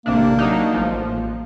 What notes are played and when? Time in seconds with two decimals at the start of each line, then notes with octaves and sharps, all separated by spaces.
0.06 A1 C3 A#3 D4
0.39 F#3 D4 D#4
0.74 A1 F3